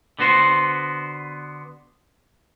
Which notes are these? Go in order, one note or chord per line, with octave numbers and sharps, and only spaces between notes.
D3 B3 F#4 C5